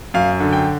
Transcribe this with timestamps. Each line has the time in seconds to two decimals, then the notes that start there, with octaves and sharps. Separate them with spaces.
0.14 F#2 F5
0.40 D3
0.53 G5